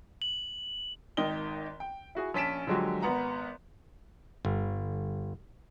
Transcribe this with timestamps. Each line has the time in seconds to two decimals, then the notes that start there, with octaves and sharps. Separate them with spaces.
0.22 F#7
1.17 G#1 D#3 D#5 G5 G7
1.80 G5
2.15 E4 F#4 G#4
2.34 A#1 C#4 A5 B6 D7 E7
2.67 D3 F3 F#3 G#3 F#4 G4
3.02 G#1 B3 F#5 A#5
4.45 G1